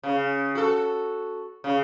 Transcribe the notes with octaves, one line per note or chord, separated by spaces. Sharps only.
C#3
F#4 A4
C#3